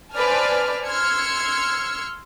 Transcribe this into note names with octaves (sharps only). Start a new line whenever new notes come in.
B4 C5 D5 G#5 A5 F6
C6 E6 F6 G#6 C#7